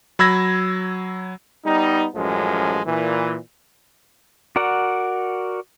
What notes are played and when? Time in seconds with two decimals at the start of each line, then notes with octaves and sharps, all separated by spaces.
0.19 F#3 B5 E6 G#6 A#6
1.66 G3 B3 D#4
2.16 A1 F#2 F3 G#3
2.86 A#2 E3
4.56 F#4 A#4 D5 F#5